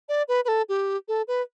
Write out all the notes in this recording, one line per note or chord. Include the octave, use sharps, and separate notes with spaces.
D5
B4
B4
A4
G4
A4
B4